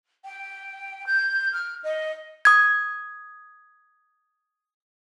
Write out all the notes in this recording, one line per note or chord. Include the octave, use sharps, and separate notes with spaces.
G5
G6
F6
D#5
D#6 G#6